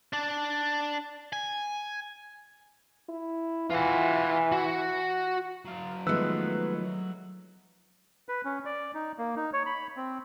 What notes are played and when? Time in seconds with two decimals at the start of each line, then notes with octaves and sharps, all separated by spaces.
0.13 D4 D5
1.33 G#5
3.09 E4
3.70 E3 F4 F#5
4.52 F#4
5.65 F#3 F5
6.07 D#3 F3 G#3 A3 B3 B4 E6 F#6
8.29 B4
8.45 C#4
8.65 D5
8.95 D#4
9.18 A#3
9.36 D#4
9.53 C#5
9.66 B5
9.97 C4